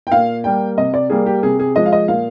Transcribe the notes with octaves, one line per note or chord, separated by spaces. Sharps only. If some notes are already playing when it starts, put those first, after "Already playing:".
G5
A#2 F5
G3 A#3 G5
C3 D#5
D5
G3 A#3 G#4
G4
C3 G#4
G#4
F3 G#3 D#5
F5
D#5
A#2 F5